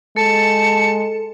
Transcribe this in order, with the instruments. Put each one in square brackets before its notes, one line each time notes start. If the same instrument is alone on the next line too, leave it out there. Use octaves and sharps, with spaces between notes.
[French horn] G#3 [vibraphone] A4 [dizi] A5 [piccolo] C#7